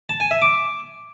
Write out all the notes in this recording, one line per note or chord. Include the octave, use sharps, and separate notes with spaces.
A5
G#5
E5
D6